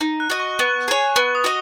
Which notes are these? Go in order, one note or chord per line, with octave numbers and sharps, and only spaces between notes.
D#4
F#6
F#4 D#5
C#6
B3 C#6
G#4 C#5
B3 C#6
D#6
F#4 D#5